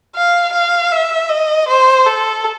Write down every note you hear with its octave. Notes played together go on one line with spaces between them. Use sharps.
F5
F5
E5
D#5
C5
A4